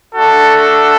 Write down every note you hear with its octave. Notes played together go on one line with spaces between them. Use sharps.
A3 D4 F#4 A4